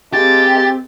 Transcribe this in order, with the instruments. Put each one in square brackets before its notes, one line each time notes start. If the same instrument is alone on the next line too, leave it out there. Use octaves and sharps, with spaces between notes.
[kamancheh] G#3 A#3 [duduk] C4 [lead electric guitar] G4 [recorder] A6